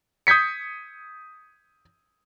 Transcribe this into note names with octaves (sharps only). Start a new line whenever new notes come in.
D#6 G6 G#6 B6 C#7